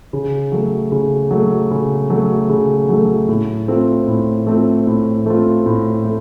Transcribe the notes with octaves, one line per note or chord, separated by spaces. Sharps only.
C#3
F#3 A3
C#3
F#3 A3
C#3
F#3 A3
C#3
F#3 A3
A2
A3 C4 F4
A2
A3 C4 F4
A2
A3 C4 F4
A2
A3